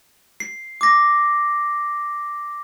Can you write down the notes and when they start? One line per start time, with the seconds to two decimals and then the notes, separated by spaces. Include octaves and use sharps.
0.40 C7
0.81 D6 A#6